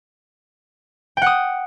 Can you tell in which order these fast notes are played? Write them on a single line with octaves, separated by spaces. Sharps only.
G5 F#5 D#6